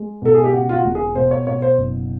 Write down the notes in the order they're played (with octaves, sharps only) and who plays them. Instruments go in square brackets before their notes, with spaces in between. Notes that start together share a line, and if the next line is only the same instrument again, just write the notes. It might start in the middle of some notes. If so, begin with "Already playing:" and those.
Already playing: [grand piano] G#3
B2 A4
G#4
G4
C#3 F#4
F4
F#4
E1
G#4
B2 C5
C#5
B2 C#5
C5
F#1